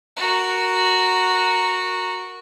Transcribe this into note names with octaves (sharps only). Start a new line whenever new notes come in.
F#4 A#4